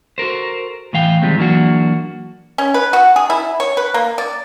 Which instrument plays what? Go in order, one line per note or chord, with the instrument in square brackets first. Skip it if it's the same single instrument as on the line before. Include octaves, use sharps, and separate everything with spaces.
[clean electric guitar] F#4 A4 A#4 C5
A2 E3 F5 G5
D#3 F3 G3 G#3 C4
E3 F#3 A#3 D4 F#4
[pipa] C#4
B4
F#4
G#4
E4
C#5
B4
A#3
D5